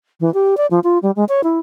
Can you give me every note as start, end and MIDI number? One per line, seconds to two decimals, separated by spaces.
0.20 0.32 52
0.34 0.57 67
0.57 0.67 74
0.71 0.80 53
0.84 0.98 65
1.02 1.11 55
1.16 1.24 56
1.29 1.41 73
1.44 1.59 64